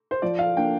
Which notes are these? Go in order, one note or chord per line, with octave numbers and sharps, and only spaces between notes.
C5
F3 D5
F5
A#3 D4 G5